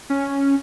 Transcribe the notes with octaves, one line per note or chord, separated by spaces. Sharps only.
C#4